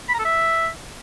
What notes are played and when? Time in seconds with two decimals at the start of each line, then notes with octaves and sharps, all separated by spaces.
0.09 B5
0.14 A#5
0.19 A4
0.25 E5